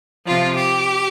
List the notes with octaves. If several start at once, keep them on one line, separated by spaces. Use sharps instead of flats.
C3 F3 F4
G4